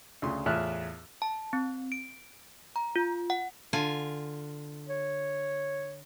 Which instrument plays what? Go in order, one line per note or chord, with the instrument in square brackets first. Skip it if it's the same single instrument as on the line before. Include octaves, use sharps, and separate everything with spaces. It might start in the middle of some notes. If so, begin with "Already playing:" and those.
[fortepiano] D2 C#3 C6
E2 A2 F4 E5 F6 F#6
[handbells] A5
C4
D7
A#5
F4
F#5
[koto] D3 F4 G#5
[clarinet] C#5